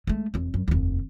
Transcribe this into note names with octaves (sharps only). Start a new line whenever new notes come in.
G#3 A3
F1 E2
F#2
F1 D#2